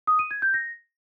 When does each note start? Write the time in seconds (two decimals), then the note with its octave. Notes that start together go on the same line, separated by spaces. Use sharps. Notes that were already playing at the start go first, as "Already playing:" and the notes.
0.07 D#6
0.19 D#7
0.31 G#6
0.42 G6
0.54 A#6